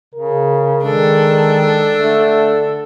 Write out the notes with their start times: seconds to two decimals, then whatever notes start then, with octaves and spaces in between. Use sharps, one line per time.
0.14 C#3 A#4
0.84 D#3 G#3 D4 A4
1.96 D3 A3